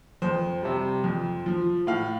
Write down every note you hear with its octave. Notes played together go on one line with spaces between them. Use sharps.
F2 C5
C3 G3
F2
F3
A2 F5